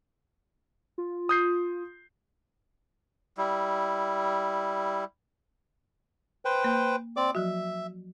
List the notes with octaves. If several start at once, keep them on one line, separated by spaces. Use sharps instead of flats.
F4
D#6 G6 C7
G3 E4
B4 C5 G5
A#3
C4 D5 D6
F3 F#3 F#4 E5